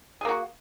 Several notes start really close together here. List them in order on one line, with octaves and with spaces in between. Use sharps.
G#4 A#3 F#4